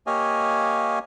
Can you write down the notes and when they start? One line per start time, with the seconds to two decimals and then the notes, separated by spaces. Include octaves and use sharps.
0.07 A#3 G4 C#5 D#5 F5 G#5